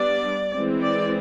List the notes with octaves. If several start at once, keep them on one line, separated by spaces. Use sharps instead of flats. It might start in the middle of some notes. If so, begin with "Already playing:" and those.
Already playing: G3 B3 D4 D5
E3 G#3 C4
D5